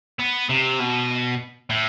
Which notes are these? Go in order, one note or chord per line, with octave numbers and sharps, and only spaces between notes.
B3
C3
B2
A2